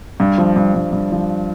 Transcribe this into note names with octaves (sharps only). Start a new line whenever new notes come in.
G2
F3
G2
G2
G2
F3